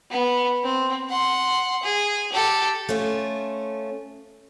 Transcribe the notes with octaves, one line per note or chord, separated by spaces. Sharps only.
B3
C4
F#5 C6
G#4
G4 A4
A3 C#4 F4